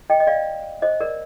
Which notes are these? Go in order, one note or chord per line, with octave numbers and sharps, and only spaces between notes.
D#5 G5
D#5
D5 F5
C5 D#5
A#4 D5